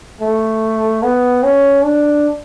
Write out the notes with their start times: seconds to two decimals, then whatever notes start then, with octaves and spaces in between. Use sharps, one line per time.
0.21 A3
1.03 B3
1.43 C#4
1.85 D4